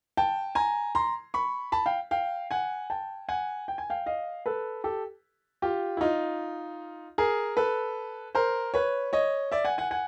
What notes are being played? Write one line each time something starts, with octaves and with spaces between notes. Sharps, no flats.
G5 A5
G#5 A#5
A#5 C6
B5 C#6
A5 B5
F5 G5
F5 G5
F#5 G#5
G5 A5
F#5 G#5
G5
G#5
F5 G5
D#5 F5
A4 B4
G4 A4
F4 G4
E4
D#4 F4
G#4 A#4
A4 B4
A#4 C5
B4 C#5
C#5 D#5
D5 E5
F#5 G#5
F#5 G#5
F#5 G#5